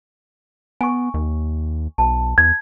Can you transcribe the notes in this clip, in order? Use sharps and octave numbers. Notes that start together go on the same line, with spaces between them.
B3 G#5 C#6
D#2
B1 A5
E2 G#6